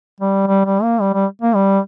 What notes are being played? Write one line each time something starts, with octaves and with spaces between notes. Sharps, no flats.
G3
G3
G3
A#3
G3
G3
A#3
G3